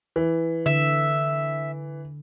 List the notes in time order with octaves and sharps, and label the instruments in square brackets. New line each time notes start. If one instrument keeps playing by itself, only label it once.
[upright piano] E3
[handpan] D3 [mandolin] E5